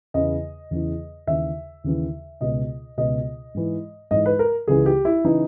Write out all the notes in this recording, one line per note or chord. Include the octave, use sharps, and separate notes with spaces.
E2 C#3 E3 D#5
E2 C#3 E3
D#2 C#3 E3 E5
D#2 C#3 E3
C#2 B2 D#5
C#2 B2 D#5
G#2 E3
G#2 E3 D#5
B4
A#4
C#2 C#3 E3 G#4
G4
E4
C#3 E3 D#4